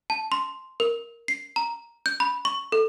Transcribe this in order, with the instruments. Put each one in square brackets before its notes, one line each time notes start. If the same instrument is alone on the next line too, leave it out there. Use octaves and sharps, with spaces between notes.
[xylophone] A5
C6
A#4
C7
A#5
G6
B5
C#6
A4